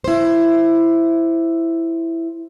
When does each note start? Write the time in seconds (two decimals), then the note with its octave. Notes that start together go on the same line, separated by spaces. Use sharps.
0.04 E4 C5